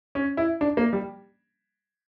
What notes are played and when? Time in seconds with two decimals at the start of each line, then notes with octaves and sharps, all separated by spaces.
0.15 C#4
0.37 E4
0.61 D4
0.77 A#3
0.93 G3